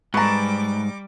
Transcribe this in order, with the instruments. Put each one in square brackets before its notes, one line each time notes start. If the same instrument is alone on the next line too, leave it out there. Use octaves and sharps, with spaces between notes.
[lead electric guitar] G#2 [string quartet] G3 D6 [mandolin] B4 A5 [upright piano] A#5 C#6